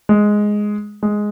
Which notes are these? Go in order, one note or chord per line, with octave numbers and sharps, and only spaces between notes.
G#3
G#3